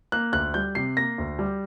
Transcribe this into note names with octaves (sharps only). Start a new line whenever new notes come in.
A#3 F#6
D2 F#6
G3 G6
C3 C7
A#3 A#6
D2
G3